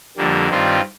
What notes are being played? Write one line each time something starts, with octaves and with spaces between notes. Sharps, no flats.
F2 D3 G3 A#3
G2 D#3 G3 C4 F4